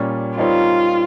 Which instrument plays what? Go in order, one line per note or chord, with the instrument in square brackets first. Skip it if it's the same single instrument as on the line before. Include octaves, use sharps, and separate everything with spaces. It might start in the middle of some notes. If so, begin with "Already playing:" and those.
Already playing: [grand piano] A#2 G3 C#4
[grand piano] G3 C4 D#4 A#4 C#5 [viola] F4